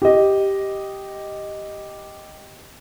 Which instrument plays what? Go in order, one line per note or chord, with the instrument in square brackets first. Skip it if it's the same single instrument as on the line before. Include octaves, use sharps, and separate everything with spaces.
[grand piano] G4 D#5